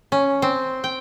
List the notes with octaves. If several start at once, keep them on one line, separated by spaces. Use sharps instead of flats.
C#4
C4
G5